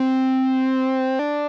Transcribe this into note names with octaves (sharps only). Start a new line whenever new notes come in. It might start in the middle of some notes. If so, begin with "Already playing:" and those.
Already playing: C4
D4